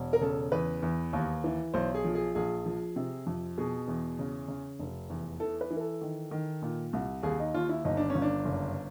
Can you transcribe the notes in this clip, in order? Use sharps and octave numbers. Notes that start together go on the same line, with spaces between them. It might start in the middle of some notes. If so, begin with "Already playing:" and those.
Already playing: E1
A#4
C#3 A4
E2 B4
E2
D#2
E3
B1 C5
G#4
F3
G#4
A#1 G#4
F3
C3
F2
B2 G#4
E2
C#3
C#3
F1
E2
E3 A4
B4
E3
A#4
A4
D#3
D#3
A#2
C2
D#2 G#4
D#4
D#2 F4
E4
G1 D#4
D4
G1 C#4
D4
F#1